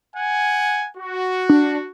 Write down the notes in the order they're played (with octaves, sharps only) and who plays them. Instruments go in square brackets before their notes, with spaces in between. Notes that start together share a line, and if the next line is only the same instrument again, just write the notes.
[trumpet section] F#5 G#5
F#4
[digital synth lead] D4